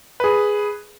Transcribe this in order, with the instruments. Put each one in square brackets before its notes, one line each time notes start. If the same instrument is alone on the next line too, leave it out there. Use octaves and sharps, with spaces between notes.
[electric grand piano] G#4 B4